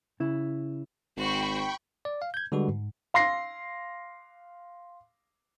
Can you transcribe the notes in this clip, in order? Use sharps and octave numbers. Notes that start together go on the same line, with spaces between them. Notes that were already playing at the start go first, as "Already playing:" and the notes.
C#3 E4
G#1 F#4 C5 G5 B5 C#6
D5
F5
G6 G#6
D3 G3 G#3 F#4 B4
G#2
F5 C6 A#6 C7